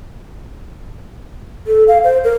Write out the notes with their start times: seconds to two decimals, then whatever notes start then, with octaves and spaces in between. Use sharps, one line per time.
1.67 A4
1.88 F5
2.04 C5
2.24 A#4